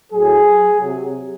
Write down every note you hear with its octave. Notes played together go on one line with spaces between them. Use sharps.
A2 F#3 G#4
C3 F#3